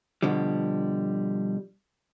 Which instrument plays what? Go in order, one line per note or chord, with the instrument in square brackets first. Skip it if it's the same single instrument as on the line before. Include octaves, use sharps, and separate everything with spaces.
[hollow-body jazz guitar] B2 D3 F3 G3